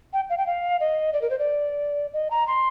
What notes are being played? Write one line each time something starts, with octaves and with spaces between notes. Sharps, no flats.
G5
F5
G5
F5
D#5
D5
A#4
C5
D5
D#5
A#5
C6